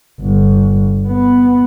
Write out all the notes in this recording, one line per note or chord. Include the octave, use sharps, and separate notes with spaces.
G1
B3